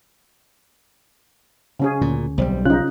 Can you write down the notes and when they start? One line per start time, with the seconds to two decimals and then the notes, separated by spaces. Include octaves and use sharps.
1.80 C#3 C#4 G#4
2.01 D2 A#2
2.38 B1 F#3 G3 C4
2.66 C#3 C#4 D#4 F4 F#6